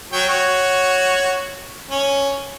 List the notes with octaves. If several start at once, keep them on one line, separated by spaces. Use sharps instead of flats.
F#3 C#5 G5
F#4 C#5
C#4